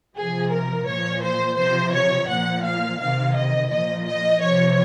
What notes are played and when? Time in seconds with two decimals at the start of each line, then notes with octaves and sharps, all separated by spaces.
0.16 C3 F3 G#4
0.51 A#4
0.87 A#2 F3 C#5
1.22 C5
1.57 C3 F3 C5
1.94 C#5
2.28 A#2 F3 F#5
2.63 F5
2.99 C3 D#3 F5
3.34 D#5
3.70 A#2 F3 D#5
4.06 D#5
4.41 C3 F3 C#5